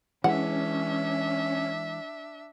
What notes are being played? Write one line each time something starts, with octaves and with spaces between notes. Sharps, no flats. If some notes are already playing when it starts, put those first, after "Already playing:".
E3 G#3 C#4 D4 E5 F#5